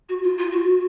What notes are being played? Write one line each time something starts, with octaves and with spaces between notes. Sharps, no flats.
F#4
F4
F4
F#4
F#4